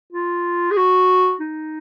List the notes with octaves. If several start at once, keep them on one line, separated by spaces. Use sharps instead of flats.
F4
G#4
F#4
D#4